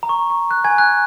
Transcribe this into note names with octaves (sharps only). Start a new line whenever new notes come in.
A#5
C#6
C#6
F#6
G#5 G#6
F#6